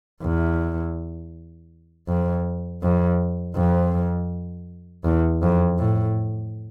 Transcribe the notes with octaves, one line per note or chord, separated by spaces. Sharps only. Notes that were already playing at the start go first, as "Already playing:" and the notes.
E2
F2
F2
F2
E2
F2
A2